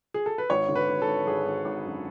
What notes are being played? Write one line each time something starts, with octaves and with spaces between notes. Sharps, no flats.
G#4
A4
B4
G#1 C#5
D3
B4
G#1
A4
G#1
G#1 G#4
G#1
G#1
F#2